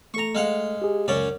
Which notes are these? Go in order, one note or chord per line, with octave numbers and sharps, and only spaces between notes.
A3 A4 A#5 C#6
G#3 F5 F#5
G4 G#4
C#2 F#2 C#4 D5